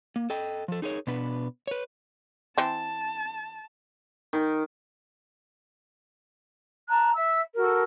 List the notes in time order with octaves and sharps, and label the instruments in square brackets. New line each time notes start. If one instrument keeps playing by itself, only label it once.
[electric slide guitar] A#3
A4 D#5 G5
F3 A4
D#4 G#4 A#4 C#5
B2 B3 D4 B4
B4 C#5
[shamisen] E3 C4 [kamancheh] A5
[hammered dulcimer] D#3
[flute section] A5 A#5 F#6
E5 E6
F#4 A4 A#4